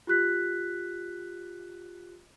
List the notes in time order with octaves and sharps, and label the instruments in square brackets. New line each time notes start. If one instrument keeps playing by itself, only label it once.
[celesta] F4 G4 F#6 B6